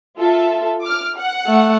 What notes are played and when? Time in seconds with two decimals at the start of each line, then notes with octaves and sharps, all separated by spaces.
0.17 F4 A4 E5
0.82 D6 F6
1.16 F#5
1.47 A3